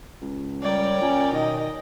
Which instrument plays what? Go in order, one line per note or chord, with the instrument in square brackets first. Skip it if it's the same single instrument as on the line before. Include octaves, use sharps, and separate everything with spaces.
[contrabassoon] C#2
[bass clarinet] G3 [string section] A#4 C#5 G5 [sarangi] D5
[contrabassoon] A#2 [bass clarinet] C#4
[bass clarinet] B2 [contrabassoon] D#3 [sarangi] D#5